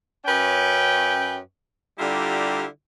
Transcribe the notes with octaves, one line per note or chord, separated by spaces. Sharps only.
F#2 C#4 B4 G5
D3 G3 E4 F4 G4 A#5